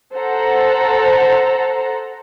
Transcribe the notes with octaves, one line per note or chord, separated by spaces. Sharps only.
A4 C5 F#5 A#5